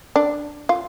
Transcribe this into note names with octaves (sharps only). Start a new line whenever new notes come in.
D4
F4